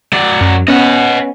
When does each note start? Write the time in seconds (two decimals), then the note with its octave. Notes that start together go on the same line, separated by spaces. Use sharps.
0.13 F#3 D5
0.41 F#2
0.68 B3 C#4 D#5 F#5